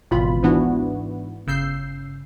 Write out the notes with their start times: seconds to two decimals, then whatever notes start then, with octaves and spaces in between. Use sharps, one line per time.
0.11 G#1 C#2 B2 E3 F4 B5
0.43 G#2 E3 B3 D4 E4 F#4
1.47 G1 C#3 E6 G6 C7